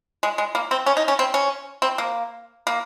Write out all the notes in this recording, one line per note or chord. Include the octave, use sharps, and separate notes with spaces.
G#3
G#3
A#3
C4
C#4
D#4
C#4
C4
C#4
C4
A#3
A#3